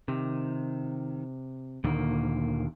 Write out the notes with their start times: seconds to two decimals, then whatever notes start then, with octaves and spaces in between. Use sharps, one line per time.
0.08 C3 D#3
1.84 D2 A#2 D3 D#3 A#3